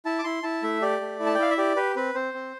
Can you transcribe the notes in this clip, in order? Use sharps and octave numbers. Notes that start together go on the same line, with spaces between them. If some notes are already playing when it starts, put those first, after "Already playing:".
E4 A5
D6
E4 C6
E4 A5
A3 E5
G4 D5
A3
E4
A5
G5
E4 F5
E5
G4 D5
G4 B4
C4 B4
C4 C5
C4